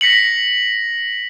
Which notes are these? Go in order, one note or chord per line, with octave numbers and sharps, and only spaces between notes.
A#6 B6 C#7 F#7